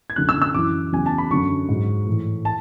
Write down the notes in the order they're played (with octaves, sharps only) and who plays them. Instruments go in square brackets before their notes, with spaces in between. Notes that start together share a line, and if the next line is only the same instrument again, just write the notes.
[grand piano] G#6
F#2 D3 F#3 F#6
E6
E6
F#2 E3 D6
E2 C#3 F#3 G#5
A5
B5
F#2 D3 F#3 C#6
G#2 F#3
A2 E3
A5